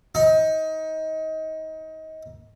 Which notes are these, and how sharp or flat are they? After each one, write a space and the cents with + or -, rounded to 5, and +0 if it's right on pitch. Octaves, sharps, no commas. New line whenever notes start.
D#4 +25